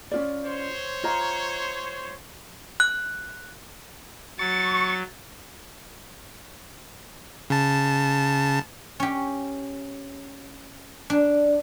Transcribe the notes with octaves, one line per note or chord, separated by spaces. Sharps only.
C#4 F4 D5
C5 C#5
F4 D#5 A#5
F#6
F#3 C#6 A6
C#3 A5
C#4 G4
D4